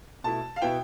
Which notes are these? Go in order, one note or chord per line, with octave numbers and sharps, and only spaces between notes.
B2 A3 E4 A5
F5
B2 B3 E4 G5